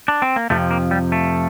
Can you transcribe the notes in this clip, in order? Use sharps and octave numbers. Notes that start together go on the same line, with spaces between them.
D4
C4
A#3
F2 C3 F3 A3
A#3
G3
A3